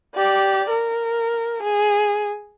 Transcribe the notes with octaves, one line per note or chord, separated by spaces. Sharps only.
G4 D5
A#4
G#4